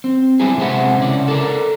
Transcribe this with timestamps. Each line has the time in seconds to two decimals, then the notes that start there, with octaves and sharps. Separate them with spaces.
0.04 C4
0.40 G3 B3 D4 E4 G#4
0.58 C3 G#3 C5 E5 F#5
0.98 C#3 E4 D5
1.28 A4 A#4 D5